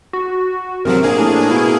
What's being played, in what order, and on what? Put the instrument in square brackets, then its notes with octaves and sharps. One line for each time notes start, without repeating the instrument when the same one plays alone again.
[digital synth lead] F#4
[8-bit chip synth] G#1 F3 F#3 [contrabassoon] C3 [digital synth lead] A#4
[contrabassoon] A#1 [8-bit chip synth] A#3 G#4
[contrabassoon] A2 [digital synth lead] D4
[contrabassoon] B2 [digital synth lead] E4